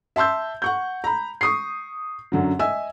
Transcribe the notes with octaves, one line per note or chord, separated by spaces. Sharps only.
E5 A5 C6 E6 G6
F#5 C#6 G6
A#5 B5
C#6 D#6 C7
F#2 D3 F#3
D#5 E5 G#5 E6